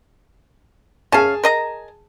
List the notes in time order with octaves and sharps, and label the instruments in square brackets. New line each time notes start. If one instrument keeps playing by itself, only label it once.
[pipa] C#4 F5 [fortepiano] G#4 G#5 A5
[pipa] A#4 D#5 A#5